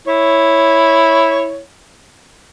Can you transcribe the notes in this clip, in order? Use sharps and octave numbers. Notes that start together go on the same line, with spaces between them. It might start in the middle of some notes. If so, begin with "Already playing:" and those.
E4 C#5